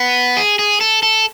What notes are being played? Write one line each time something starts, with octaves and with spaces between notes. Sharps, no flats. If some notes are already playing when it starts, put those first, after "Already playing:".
Already playing: B3
G#4
G#4
A4
A4